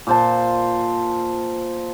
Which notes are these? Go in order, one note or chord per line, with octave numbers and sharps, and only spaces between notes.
A#2 C5 A5